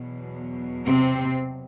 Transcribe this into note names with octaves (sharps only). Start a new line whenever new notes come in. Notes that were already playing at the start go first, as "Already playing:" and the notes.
Already playing: E2 B2 F#3
C3 C4